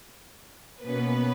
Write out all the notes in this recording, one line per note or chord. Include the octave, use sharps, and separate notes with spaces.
B2 A#3 B3 C#4 B4